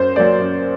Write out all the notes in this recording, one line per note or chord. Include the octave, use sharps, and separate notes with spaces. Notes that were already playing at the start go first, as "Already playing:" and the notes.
Already playing: F#2 C5
F#3 A#3 D5
F#2